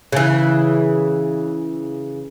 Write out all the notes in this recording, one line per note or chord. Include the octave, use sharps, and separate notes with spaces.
C#3 E3